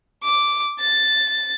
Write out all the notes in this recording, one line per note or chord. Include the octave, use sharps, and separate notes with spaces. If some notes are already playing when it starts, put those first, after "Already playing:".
D6
A6